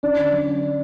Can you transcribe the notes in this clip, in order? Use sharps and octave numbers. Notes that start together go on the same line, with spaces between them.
C#4 D4
D3
F#3
C#4
C#4